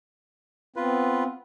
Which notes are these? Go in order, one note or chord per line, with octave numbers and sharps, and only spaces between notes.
B3 C4 F4 B4